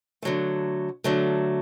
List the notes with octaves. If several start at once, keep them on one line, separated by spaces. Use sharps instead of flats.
D3 F#3 A3
D3 F#3 A3